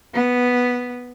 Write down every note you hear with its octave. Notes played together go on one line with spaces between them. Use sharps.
B3